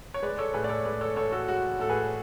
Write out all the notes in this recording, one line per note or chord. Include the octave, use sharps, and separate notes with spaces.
C#5
G#3 B4 D5
A4 C#5
A2 G#4 B4
D5
A4 C#5
G#3 B4 D5
A4 C#5
A2 A4 C#5
F#4 A4
G#3 F#4
A2 A4
G#4 B4